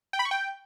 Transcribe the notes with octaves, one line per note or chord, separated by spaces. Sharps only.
G5
B5
C#6
G5